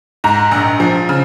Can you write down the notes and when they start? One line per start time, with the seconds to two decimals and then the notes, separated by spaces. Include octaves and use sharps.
0.24 G#2 A#5
0.51 A#1
0.80 F3
1.09 C#3